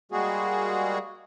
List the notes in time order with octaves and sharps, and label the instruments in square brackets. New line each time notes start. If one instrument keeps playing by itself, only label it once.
[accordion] G3 G#3 A#3 F#4 G#4